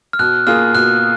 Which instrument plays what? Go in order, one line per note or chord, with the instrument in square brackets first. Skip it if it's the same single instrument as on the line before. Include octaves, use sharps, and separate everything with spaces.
[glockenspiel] F6
[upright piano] B2 [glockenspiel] F#6
[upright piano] A#3 F4 G#4 [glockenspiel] F6
[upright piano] B2 [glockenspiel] F#6